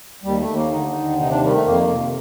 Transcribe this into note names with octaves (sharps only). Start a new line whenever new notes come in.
D#2 G3
A3
D#2
A#3
D3 D#4
D#2
C3 D#4
D4
D#3 G3
A3
F2 A#3
C3